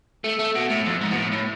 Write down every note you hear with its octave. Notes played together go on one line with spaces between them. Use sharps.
A3
A3
B2
A2
F2
G#2
B2
A2
A2